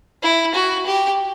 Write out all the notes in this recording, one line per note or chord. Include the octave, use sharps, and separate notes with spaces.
E4
F#4
G4